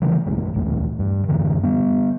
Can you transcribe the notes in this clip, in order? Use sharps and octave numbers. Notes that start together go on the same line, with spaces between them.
C#3 E3 F3 A3
D#1 A#1 F#2 G#3
D1 A#1 E2 A2
G2
F#2 A2 D3 E3
G3 B3